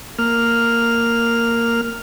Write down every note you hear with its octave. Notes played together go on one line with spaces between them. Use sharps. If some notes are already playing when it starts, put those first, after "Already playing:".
A#3 F6